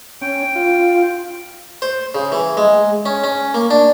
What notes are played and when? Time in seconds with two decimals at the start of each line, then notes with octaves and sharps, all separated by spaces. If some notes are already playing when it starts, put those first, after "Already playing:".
0.22 C#4 G5
0.56 F4
1.82 C5
2.15 C#3
2.32 E3
2.57 G#3
3.06 C#4
3.24 C#4
3.54 A#3
3.71 D4